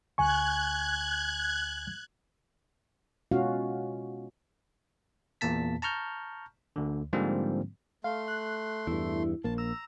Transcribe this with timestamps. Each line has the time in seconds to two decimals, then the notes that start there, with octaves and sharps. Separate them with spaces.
0.18 D2 G#5 C#6 F#6 G#6
3.32 B2 G#3 C#4 F4 F#4 F5
5.41 E2 A#2 A#3 A5 B6
5.82 A5 A#5 C#6 F6 G6
6.76 D2 D3
7.13 G#2 D3 F3 G3 A#3 C4
8.04 A3 F5 C6
8.28 F#6
8.87 E2 G2 E4
9.44 A#1 A#3 A5
9.58 A#5 E6